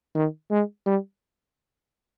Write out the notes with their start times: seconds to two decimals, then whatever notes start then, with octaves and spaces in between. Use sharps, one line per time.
0.15 D#3
0.51 G#3
0.86 G3